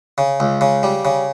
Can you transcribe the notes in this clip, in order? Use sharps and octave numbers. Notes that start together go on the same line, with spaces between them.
C#3
C#2
C#3
G3
C#3